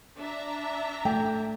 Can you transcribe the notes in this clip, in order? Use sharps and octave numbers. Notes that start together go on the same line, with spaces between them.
D4 E5 A#5
A3 G5